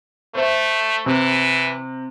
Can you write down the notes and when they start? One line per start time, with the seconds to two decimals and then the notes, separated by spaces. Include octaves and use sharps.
0.35 A3 C5 E5
1.06 C3 E3